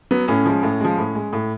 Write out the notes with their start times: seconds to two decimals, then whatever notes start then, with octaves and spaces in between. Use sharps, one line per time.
0.11 F#3 B3
0.28 A2 C#4
0.45 F3 G#3
0.63 A2
0.80 F3 G#3
0.98 A2
1.15 G#3
1.33 A2